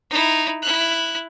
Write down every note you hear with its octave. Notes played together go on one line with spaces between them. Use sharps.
D#4 E4
E4 F#6